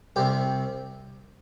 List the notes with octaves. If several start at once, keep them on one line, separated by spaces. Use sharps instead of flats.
C2 C3 G4